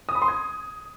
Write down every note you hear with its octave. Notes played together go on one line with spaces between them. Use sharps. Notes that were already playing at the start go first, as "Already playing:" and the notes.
D#6
B5
C6
G#6